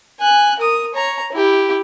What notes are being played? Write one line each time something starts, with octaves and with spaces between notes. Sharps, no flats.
G#5 F#6
A#4 D#6
C#5 A#5
E4 G4